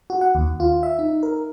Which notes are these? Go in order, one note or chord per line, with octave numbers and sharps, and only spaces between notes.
F#4
F#5
D#2
F4
E5
D#4
A#4